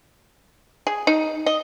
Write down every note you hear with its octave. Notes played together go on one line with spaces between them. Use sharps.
G#4
D#4
D#5